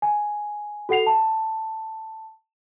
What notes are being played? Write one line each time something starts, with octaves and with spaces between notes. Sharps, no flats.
G#5
F#4 A4 F#5 C7 F7
A5